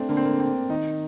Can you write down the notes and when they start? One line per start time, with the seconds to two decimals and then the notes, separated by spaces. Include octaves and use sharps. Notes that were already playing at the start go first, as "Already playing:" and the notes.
Already playing: A3 C4 D4
0.09 D3 A#3
0.17 C4
0.25 A#3
0.40 C4
0.70 D#3 D#4